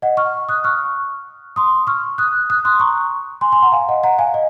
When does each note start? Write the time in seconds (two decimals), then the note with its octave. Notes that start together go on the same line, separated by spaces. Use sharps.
0.02 D#5 F#5
0.17 C#6 F6
0.49 D#6 F#6
0.64 C#6 F6
1.56 C6 D#6
1.87 C#6 F6
2.18 D#6 F#6
2.50 D#6 F#6
2.65 C6 D#6
2.80 A#5 C#6
3.41 G#5 C6
3.52 G#5 C6
3.62 F#5 A#5
3.72 F5 G#5
3.89 D#5 F#5
4.04 F#5 A#5
4.19 F5 G#5
4.34 D#5